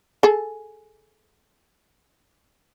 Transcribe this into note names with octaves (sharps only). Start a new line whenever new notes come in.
G#4 A4